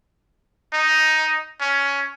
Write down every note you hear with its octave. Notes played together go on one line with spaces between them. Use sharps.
D#4
C#4